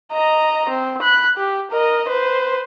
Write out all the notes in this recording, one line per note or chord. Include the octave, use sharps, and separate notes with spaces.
D#5 A#5
C4
B5 F#6
G4
A#4 D#5
B4 C5